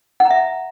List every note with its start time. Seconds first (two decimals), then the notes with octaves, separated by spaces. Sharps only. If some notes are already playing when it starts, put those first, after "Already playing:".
0.20 F#5
0.25 A#5
0.30 E5